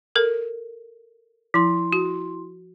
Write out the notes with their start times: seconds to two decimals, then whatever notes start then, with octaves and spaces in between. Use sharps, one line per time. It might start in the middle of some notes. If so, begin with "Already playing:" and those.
0.16 A4 A#4
1.54 F3 E4 C6
1.93 F#4